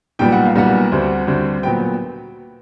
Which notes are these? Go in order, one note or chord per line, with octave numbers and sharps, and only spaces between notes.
B1 A#2 G3 B3 G5
F#5
F5
B1 A#2 G3 B3 F#5
D2 D3 G3 C4
D2 D3 G3 C4
A#2 F#3 B3 G5